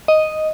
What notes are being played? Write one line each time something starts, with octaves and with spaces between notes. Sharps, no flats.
D#5